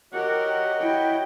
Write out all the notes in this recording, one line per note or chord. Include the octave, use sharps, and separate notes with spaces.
F#4 G4 A#4 C#5 D#5 F#5
E4 G5